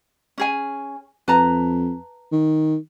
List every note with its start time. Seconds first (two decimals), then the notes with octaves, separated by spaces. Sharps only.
0.38 C#4 G#4 G#5
1.28 F2 B4 A5 A#5
2.32 D#3